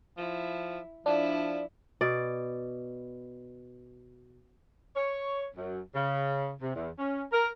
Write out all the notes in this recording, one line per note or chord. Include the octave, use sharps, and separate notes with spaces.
F3 E4
F3 D4 E4
B2 D5
C#5
F#2
C#3
C3
E2
C#4
A#4